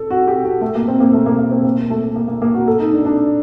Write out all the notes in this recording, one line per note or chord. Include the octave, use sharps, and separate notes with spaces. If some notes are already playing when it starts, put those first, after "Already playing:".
Already playing: A4
F#4
G4
F#4
A3
A#3
C4
A#3
A3
A#3
A#3
C4
A#3
A3
A#3
A#3
A#3
F#4
A4
D#4
D4
D4